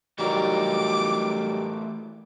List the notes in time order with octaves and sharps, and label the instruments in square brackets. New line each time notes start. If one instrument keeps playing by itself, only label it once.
[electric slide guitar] E3 A3 A#4 [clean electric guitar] F#3 G3 D#4 [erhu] D6